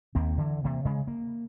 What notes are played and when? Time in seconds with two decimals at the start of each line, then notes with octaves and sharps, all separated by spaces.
0.15 D#2 A#3 C4
0.37 D3 E3
0.64 C3 E3 A#3
0.85 C#3 G#3
1.07 A#3